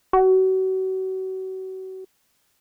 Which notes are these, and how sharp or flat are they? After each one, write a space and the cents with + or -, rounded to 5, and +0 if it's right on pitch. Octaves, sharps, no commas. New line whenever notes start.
F#4 +35